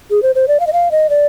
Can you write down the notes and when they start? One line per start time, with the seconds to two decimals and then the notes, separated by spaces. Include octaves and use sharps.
0.11 G#4
0.23 C5
0.35 C5
0.48 D5
0.60 F5
0.67 D#5
0.73 F5
0.91 D#5
1.10 D5